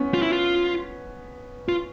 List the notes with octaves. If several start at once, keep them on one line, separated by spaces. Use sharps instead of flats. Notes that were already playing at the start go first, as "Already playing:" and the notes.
Already playing: B3 C#4
F4
E4
F4
F4